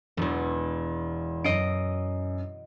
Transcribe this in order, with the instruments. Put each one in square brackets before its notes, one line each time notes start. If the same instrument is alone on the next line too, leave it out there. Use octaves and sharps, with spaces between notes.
[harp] E1 E2
[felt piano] F#2 C7 [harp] D#5 D7